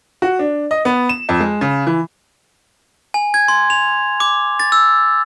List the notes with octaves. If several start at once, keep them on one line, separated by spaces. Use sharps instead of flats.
F#4
D4
D#5
B3
E7
F2
G#3
C#3
E3
G#5
G#6
C6
F7
D6
A6
E6